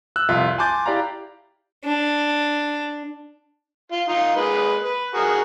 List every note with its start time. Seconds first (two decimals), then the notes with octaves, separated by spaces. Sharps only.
0.16 E6 F#6
0.29 C2 F2 F4 E5
0.58 G#5 A5 C6 D6 G6 A6
0.86 E4 G4 D5 F5 A#5
1.85 D4
3.92 F4
4.08 D#4 F4
4.36 G#3 A#3 B4
4.84 B4
5.14 F#4 G#4 A#4